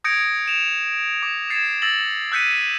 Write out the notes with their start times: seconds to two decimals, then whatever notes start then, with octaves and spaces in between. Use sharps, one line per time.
0.04 D#6 G6 G#6 A#6 C#7 D7
0.46 D7 E7 F7
1.23 D6
1.50 G#6 A6 C7 C#7 E7
1.82 E6 A6 A#6 F#7
2.32 E6 F#6 G6 B6 C#7 D#7